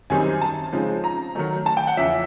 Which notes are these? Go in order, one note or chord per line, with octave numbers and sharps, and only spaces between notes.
F#2 D#3 G3 C4 D#4 G#5
A5
C#3 F3 G#3 C4 D#4
A#5
D#3 F#3 A3
A5
G5
F#5
E2 C#3 F3 E5